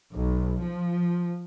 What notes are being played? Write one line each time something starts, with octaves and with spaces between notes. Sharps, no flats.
B1
F3